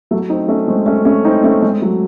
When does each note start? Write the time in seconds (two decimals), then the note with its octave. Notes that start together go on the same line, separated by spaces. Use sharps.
0.11 F#3 A3
0.29 C4 D#4
0.48 A3 C#4
0.67 G#3 C4
0.86 A3 C#4
1.05 A3 C#4
1.25 C4 D#4
1.43 A3 C#4
1.62 G#3 C4
1.81 F#3 A3